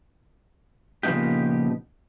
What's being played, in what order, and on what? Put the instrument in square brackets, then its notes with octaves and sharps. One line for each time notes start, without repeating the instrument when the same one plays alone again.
[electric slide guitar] A#2 C#3 F3 B3 D#4 G4